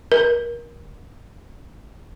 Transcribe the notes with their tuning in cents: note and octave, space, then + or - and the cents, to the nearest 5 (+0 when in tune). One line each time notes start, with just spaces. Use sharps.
A#4 +25